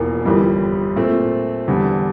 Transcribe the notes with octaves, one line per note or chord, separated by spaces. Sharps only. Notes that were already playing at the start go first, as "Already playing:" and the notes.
Already playing: E1 E2 E3 A#3 F4
G1 F2 E3 G3
A#2 A3 C4
E2 D3 G3